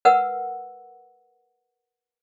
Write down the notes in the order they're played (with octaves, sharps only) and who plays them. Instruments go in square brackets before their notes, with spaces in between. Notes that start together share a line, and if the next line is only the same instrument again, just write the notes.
[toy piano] A#4 B4 F#5 E6